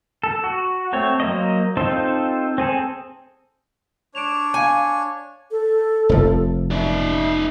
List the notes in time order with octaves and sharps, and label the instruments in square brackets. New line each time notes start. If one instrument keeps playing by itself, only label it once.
[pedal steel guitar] A4
F#4
A3 C4 C#5
F#3 A#3 C5 D#5
C4 D#4 F4 A4 C5
C4 G#4 A4
[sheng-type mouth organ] D4 C#5 [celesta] D7 E7 F7
[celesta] F5 D#7 [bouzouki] G#5
[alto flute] A4
[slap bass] F1 F3
[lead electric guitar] D#4 D5 [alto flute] E5